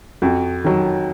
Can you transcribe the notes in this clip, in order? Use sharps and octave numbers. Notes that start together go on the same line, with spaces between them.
F2 F#4
D#3 F#3